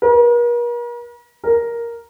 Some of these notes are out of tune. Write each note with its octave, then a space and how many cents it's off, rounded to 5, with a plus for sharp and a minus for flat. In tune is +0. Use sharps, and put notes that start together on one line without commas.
A#4 +45
A#4 +5